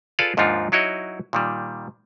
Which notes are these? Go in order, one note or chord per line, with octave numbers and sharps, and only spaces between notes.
F4 G#4 A4 B4 D5 F5
D#2 G#2 F3 D4 D#4 F4
F#3 D#4 E4 F#4 C#5 D#5
A#2 D#3 G3